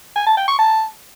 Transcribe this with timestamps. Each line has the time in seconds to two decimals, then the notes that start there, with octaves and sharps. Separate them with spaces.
0.16 G#5
0.26 A5
0.37 G5
0.48 C#6
0.59 A5